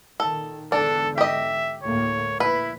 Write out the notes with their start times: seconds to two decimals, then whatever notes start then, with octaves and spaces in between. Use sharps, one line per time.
0.20 A#2 D#3 A4
0.72 E2 G#2 D3 D4 A4
1.18 G4 D#5 E5
1.83 D2 A2 A#3 C#5
2.40 A#1 E4 B4